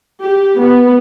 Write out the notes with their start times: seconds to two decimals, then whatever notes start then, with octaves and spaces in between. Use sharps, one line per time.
0.24 G4
0.61 B3